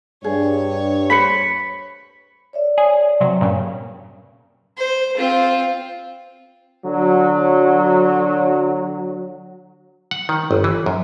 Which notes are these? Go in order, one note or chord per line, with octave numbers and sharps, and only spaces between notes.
G2 G#4 C#5
B4 C5 B5 B6 C#7
C#5 D5 E5
G#4
C3 F#3
G2 A#2 C#3
C5
C4 F4
D3 F#3
F#5
D#3
G1
E3
F#2